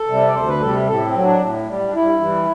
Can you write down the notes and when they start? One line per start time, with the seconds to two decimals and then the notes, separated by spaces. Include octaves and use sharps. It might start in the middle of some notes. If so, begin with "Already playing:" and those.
Already playing: A4
0.08 C3 G3
0.27 D5
0.35 D2 C5
0.48 B4
0.61 C3 G3 A4
0.88 A2 A4
1.06 C4
1.14 F#3
1.24 D4
1.41 A2
1.67 G3
1.89 D4
1.94 G2 E4
2.20 E3 G3